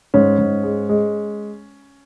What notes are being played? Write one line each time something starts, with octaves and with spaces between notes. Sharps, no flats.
G#2 C#4
G#2
G#3
G#3